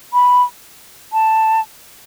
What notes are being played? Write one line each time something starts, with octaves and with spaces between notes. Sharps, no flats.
B5
A5